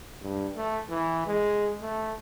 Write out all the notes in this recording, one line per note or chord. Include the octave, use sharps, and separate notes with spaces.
G2
A3
E3
G#3
A3